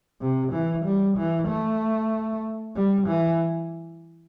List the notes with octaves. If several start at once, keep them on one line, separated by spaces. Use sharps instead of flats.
C3
E3
G3
E3
A3
G3
E3